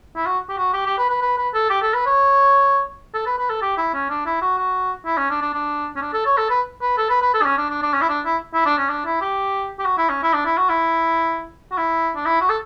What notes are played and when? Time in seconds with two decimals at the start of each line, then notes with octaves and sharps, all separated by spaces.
0.16 E4
0.26 F#4
0.49 G4
0.58 F#4
0.73 G4
0.86 G4
0.98 B4
1.10 B4
1.22 B4
1.38 B4
1.54 A4
1.70 G4
1.82 A4
1.94 B4
2.06 C#5
3.14 A4
3.26 B4
3.38 B4
3.50 A4
3.62 G4
3.78 E4
3.94 C#4
4.10 D4
4.26 E4
4.42 F#4
4.58 F#4
5.06 E4
5.18 C#4
5.30 D4
5.42 D4
5.54 D4
5.96 C#4
6.02 D4
6.13 A4
6.26 C#5
6.37 A4
6.50 B4
6.82 B4
6.98 A4
7.10 B4
7.22 B4
7.34 A4
7.42 D4
7.45 C#4
7.58 D4
7.70 D4
7.82 D4
7.94 C#4
8.02 E4
8.09 D4
8.25 E4
8.54 E4
8.66 D4
8.78 C#4
8.90 D4
9.06 E4
9.21 G4
9.79 G4
9.85 F#4
9.98 E4
10.10 C#4
10.23 E4
10.33 D4
10.46 E4
10.57 F#4
10.69 E4
11.72 F#4
11.77 E4
12.16 D4
12.26 E4
12.41 F#4
12.50 A4